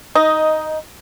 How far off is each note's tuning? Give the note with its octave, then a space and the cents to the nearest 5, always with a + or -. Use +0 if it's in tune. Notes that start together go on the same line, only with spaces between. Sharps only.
D#4 +10 D#5 +0